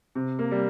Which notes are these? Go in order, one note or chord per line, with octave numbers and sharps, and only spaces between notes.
C3
A#3
G3